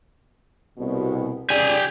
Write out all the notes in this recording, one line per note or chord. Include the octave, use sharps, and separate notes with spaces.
C2 B2
C#3 G3 G4 D5 G#5